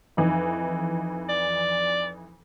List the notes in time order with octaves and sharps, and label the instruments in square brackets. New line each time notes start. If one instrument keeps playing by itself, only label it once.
[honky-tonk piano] F2 E3 D#4
[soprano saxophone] D5